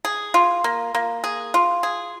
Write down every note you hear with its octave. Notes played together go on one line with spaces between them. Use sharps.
G#4
F4
A#3
A#3
G#4
F4
G#4